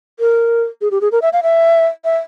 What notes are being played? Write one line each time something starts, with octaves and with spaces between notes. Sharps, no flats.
A#4
G#4
G4
G#4
A#4
E5
F5
E5
E5